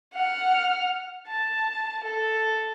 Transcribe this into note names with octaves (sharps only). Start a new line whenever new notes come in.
F#5 F6
A5
A4